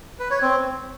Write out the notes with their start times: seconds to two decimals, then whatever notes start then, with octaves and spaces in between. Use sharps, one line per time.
0.19 B4
0.31 C#5
0.42 C4